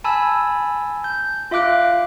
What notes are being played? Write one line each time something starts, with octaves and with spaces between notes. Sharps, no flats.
G#5 A5 B5 E6
G6
F4 E5 F5 D6 F#6 D7